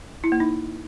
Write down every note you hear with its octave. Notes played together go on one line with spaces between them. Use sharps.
E4
A#3
D#4